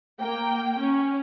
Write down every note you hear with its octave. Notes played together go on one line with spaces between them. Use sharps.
A#3 G5
C#4